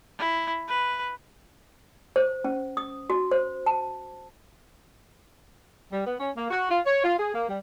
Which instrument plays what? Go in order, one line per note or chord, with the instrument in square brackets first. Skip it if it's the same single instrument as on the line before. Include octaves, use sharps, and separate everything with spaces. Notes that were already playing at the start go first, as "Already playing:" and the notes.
[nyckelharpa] E4
B4
[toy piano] C5
C#4
D#6
F#4
C5
A5
[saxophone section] G3
B3
C#4
A#3
F#4
F4
C#5
F4
G#4
A#3
G3